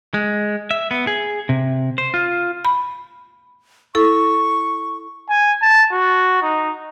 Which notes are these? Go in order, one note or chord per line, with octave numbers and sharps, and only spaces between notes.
G#3
E5
B3
G#4
C3
C5
F4
B5
E4 A4 C#6
G#5
A5
F#4
D#4